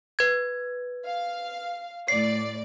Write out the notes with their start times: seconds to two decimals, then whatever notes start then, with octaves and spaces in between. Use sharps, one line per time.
0.19 B4 G#6
1.04 F5
2.08 A2 D5 C7